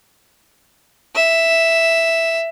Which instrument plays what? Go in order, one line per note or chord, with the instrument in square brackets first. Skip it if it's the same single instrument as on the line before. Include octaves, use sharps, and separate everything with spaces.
[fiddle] E5